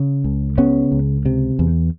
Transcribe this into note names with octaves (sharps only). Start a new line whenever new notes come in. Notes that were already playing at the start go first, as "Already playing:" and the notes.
Already playing: C#3
C#2
C#3 B3 C#4
C#2
C3
E2